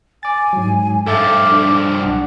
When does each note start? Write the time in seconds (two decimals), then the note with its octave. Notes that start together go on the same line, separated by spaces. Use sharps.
0.23 G#5 D6 A6
0.53 G#2 F#3
1.07 G2 F3 A4 E5 D6 A6
1.52 D4
2.02 B1 D4 F#5